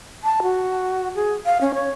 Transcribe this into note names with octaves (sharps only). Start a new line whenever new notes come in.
A5
F#4
G#4
F5
C#4
C#5